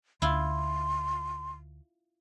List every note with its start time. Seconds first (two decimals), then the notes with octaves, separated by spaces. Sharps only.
0.22 D2 E4 F4 C6